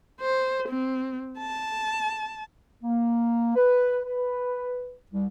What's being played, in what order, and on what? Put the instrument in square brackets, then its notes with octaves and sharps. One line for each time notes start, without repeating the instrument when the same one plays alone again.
[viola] C5
C4
A5
[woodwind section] A#3
B4
B4
C2